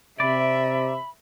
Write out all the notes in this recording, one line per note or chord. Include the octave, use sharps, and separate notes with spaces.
C3 D5 E5 B5